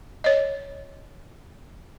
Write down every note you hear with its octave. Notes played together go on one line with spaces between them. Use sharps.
C#5 D#5